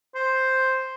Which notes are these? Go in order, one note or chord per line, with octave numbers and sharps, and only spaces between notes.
C5